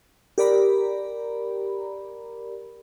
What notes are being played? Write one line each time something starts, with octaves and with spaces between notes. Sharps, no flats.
G4 A#4 D5 A#5 B5